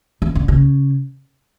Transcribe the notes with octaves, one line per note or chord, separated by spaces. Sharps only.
E3
D3
C#3